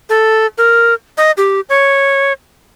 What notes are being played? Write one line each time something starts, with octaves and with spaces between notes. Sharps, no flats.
A4
A#4
D#5
G4
C#5